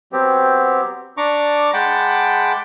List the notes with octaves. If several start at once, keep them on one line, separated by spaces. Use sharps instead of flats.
F#3 B3 C4 G4
D4 A#5 C#6 D6
G#3 F#5 G5 A5 B5 D6